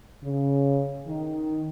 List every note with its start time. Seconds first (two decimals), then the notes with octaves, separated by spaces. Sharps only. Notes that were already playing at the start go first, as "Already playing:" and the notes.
0.23 C#3
1.05 D#3